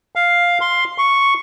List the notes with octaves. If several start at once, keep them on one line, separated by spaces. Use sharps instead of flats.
F5
C6
C#6